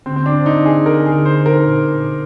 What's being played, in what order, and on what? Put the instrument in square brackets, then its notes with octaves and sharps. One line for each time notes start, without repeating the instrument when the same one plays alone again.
[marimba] D3 [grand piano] C4
[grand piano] C4
D4
[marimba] D3
[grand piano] D#4
[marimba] D3
[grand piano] G#4
[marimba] D3 [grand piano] A#4
[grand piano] G#4
[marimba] D3
[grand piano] C5
[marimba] D#4
[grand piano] A#4
[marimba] A#2
A#2